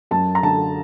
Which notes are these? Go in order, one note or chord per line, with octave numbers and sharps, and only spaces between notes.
F#2 A5
A#5
D3 A5